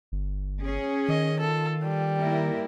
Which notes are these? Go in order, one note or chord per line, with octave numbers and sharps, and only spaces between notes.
G1
C#4 G#4
D#3 D#5
F4 A4
G3
A#3 E4 A#4